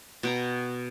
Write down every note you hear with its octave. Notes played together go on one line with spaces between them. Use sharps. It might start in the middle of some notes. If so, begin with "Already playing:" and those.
B2 G5 A#5